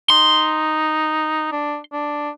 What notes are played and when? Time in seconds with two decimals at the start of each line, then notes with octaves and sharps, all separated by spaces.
0.10 D#4 C6
1.52 D4
1.93 D4